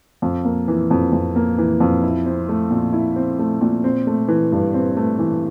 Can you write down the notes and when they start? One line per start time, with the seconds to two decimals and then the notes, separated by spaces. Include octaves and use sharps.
0.22 F2
0.45 A#3
0.68 E3
0.91 F2
1.12 F2
1.36 A#3
1.58 E3
1.80 F2
2.03 E4
2.26 C4
2.49 A3
2.71 A#2
2.93 E4
3.16 C4
3.39 A3
3.61 A#2
3.84 C4
4.07 A3
4.28 E3
4.52 G2
4.74 C4
4.97 A3
5.19 E3